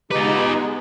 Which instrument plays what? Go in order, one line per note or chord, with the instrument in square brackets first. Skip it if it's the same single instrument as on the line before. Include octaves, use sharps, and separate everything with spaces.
[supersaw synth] G#3 B3 [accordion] D#4 [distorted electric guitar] F4 B4 [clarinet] G4